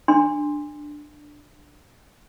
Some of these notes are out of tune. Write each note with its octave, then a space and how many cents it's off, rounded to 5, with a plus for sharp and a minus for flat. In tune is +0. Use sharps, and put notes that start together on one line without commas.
D4 +0 C6 +0